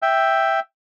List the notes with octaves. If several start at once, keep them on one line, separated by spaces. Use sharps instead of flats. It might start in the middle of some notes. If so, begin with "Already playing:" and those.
E5 G5